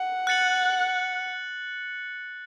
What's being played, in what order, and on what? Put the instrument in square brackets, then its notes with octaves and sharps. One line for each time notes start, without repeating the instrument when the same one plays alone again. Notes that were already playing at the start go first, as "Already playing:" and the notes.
Already playing: [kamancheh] F#5
[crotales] F#6 A6 C#7 F#7